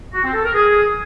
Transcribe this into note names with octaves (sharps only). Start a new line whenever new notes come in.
F#4
C4
A4
A#4
G#4